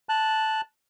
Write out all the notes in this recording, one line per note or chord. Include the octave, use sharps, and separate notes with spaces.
A5 F#6